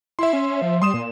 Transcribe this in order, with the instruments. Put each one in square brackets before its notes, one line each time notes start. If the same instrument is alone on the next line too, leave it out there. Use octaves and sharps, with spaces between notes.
[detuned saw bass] E4 [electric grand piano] E5 C6
[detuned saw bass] C#4
F3
[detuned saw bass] G3 [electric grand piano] C6 D#6 E7
[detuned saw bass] A#2